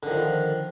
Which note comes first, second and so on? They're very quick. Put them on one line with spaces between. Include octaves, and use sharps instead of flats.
D3 D#3 F3